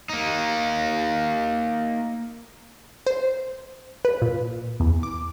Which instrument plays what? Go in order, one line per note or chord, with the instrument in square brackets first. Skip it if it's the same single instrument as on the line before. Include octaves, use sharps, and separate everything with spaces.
[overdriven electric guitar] A#3 D#4
[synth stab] C5
B4
A#2
E2
D6